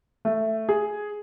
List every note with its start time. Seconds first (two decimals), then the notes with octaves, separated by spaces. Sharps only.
0.25 A3
0.69 G#4